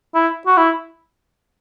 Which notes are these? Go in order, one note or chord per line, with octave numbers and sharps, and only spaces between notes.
E4
F#4
E4